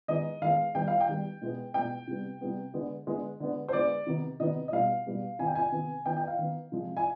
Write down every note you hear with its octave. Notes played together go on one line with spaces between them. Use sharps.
D#3 G#3 B3 D#5
D#3 G#3 B3 F5
D#3 G3 B3 G5
F5
G5
D#3 G3 B3
B2 G#3 B3
B2 G#3 B3 G5
C3 G3 B3
C3 G3 B3
D3 G#3 B3
D3 G#3 B3
D3 G#3 B3
C5
D3 G#3 B3 D5
C3 D#3 B3
C3 D#3 B3 D#5
D#5
B2 G3 B3 F5
B2 G3 B3
C3 D#3 B3 G#5
G5
G#5
C3 D#3 B3
D#3 B3 G5
G5
F5
D#3 B3
C3 F3 G#3
G#5